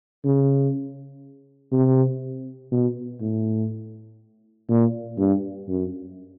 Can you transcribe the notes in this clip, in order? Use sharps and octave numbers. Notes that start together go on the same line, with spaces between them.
C#3
C3
B2
A2
A#2
G2
F#2